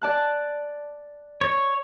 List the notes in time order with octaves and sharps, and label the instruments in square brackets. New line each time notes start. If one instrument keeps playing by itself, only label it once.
[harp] D5 A5 F#6
[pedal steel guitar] C#5